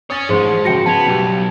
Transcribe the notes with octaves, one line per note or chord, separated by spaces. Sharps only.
C#5 G#5 D#6 A6
A1 G#2 F3 G#4 C5 C6
C#3 F#4 G5 A#6 C#7
B3 A5 G#6 F7
B1 B2 G3 G4